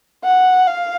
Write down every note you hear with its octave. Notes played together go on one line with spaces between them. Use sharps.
F#5
F5